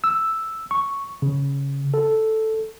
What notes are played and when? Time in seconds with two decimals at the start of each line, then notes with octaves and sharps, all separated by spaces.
0.04 E6
0.71 C#6
1.22 C#3
1.94 A4